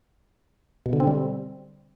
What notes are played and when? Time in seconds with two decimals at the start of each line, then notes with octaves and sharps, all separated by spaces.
0.86 B2
0.93 D3
1.00 C4
1.07 G3